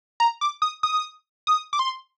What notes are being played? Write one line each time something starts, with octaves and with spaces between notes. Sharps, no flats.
A#5
D6
D#6
D#6
D#6
D6
C6